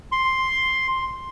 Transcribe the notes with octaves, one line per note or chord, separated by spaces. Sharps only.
C6